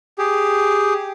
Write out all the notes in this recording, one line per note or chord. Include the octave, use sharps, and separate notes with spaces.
G4 G#4